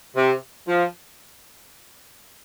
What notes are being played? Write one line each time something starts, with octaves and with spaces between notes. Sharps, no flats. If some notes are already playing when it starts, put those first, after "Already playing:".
C3
F3